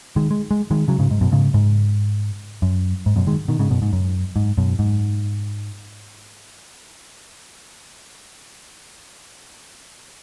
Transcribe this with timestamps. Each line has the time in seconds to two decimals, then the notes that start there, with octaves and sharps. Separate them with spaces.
0.16 D#3 G#3
0.31 G#3
0.51 G#3
0.71 D#3 G#3
0.88 C#3 F#3
0.99 G#2 C#3
1.11 G#2
1.21 F#2 B2
1.32 G#2 C#3
1.54 G#2
2.62 F#2
3.06 G#2
3.16 F#2 B2
3.27 D#3 G#3
3.48 B2 D#3
3.59 G#2 C#3
3.70 F#2 B2
3.82 G#2
3.93 F#2
4.36 G#2
4.58 F#2 B2
4.79 G#2